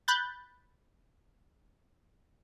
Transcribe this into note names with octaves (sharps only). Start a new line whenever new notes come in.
B5 F#6 G6 A6